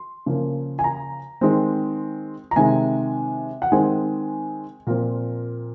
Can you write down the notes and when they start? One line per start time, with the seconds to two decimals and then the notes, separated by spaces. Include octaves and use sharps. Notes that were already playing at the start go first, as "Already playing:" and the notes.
Already playing: C6
0.26 C#3 F3 A#3
0.79 G#5
0.84 A#5
1.41 D#3 G#3 C4
2.51 A#5
2.56 C3 D#3 G#3 G#5
3.62 F#5
3.72 D#3 G#3 C4 G#5
4.87 A#2 F3 C4 A#4